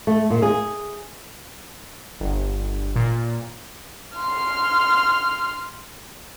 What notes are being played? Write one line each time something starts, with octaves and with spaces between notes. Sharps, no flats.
A3
A#2
G#4
G1
A#2
C6 F6